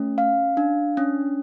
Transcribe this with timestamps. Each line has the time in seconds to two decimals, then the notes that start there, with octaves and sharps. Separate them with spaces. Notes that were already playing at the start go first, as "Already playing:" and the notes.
Already playing: A3 C#4
0.18 F5
0.57 D4
0.97 C#4